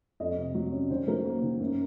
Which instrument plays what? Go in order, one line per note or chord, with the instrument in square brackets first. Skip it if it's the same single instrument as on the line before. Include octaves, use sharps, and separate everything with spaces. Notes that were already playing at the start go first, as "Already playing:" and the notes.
[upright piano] F2 D#5
C3
F#3
C#4
D#3 C5
F#3 A#4
A#3
D#3
F#2